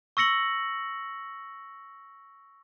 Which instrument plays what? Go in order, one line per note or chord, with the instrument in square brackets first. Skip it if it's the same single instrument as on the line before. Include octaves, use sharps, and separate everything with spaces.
[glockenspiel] C#6 E6 A#6 C#7 F#7